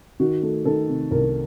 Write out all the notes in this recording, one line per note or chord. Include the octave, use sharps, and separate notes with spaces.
D#3 F#4
A3
D#3 A4
C3
C2 A#4